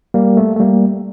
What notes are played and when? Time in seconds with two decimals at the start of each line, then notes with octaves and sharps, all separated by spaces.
0.14 G3 A#3
0.37 A3
0.56 A3
0.60 G3 A#3